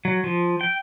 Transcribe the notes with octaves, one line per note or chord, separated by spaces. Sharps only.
F#3
F3
G5